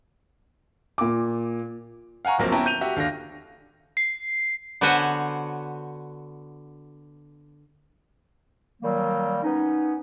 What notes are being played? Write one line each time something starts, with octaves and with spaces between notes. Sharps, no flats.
A#2 D6
F5 F#5 G#5 A#5 C#6
D1 A#1 F#3 A#3 C4
B3 C#4 E4 G5 A5 A#5
G6 D#7 F7
F#4 G4 E5
D#2 D3 F5 A#6
C7
D3 B3 F#4 C5 C#5 G#5
A#2 D#3 F#3 G3 A#3
B3 C#4 D#4